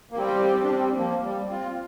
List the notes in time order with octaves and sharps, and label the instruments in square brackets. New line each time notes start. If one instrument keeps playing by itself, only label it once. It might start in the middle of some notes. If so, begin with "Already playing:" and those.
[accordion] A#3
[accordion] G3 C4 [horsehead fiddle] G4
[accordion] D4
G3 C4
F3 A#3
G3
C4 F4